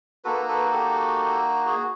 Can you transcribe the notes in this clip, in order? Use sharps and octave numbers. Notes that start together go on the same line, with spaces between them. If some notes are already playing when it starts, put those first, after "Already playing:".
A#3 D#4 F#4 A4 B4
A4 B4
G4 A4
F#4 G#4